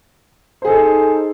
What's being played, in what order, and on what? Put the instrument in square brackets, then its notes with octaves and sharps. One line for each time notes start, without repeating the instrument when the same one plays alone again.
[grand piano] C5
G#4
A4
D#4